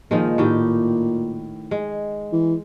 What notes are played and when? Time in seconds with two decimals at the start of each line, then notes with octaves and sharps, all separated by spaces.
0.11 A#2 D#3 F3 G#3
0.38 A2 D#3 G4
1.71 G#3
2.32 E3